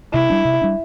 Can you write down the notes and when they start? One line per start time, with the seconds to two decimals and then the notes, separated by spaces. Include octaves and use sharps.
0.13 C3 E4
0.30 G3 D4
0.45 C3
0.62 G3 D4